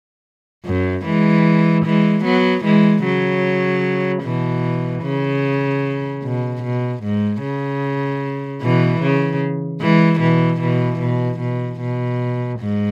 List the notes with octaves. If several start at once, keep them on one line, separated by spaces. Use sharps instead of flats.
F#2
E3 G#3
E3 G#3
F#3 B3
E3 G#3
C#3 F#3
B2 E3
C#3
B2
B2
G#2
C#3
B2 E3
C#3
E3 G#3
B2 E3
B2 E3
B2
B2
B2
G#2